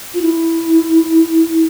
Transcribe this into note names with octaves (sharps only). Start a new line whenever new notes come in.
F4
E4